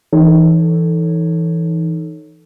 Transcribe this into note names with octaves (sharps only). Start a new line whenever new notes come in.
E3 D#4 A4 C#5